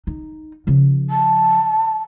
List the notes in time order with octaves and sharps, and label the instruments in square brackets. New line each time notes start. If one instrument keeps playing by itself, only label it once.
[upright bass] D#4
C#3 F3
[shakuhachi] A5